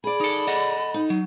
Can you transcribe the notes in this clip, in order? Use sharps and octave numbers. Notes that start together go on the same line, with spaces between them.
G#4 D5 B5
D#4 A4
A4 D#5 F#5
D#4
F#3